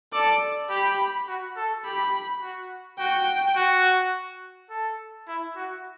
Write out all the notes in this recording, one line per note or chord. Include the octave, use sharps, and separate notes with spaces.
A4 D5
G4 B5
F#4
A4
G4 B5
F#4
F#4 G5
F#4
A4
E4
F#4